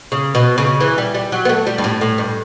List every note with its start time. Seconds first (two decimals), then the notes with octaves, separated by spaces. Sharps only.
0.12 C#3
0.35 B2
0.58 C#3
0.80 E3
0.98 G3
1.15 G3
1.32 F#3
1.45 B3
1.49 A3
1.67 G3
1.78 G2
1.84 A2
2.01 A2
2.18 G2